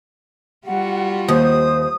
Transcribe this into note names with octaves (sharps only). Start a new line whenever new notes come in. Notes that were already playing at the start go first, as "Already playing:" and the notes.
G3 F4 F#4 F#5
D#2 C5 D#6